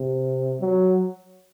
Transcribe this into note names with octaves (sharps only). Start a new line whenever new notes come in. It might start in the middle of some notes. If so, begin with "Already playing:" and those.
Already playing: C3
F#3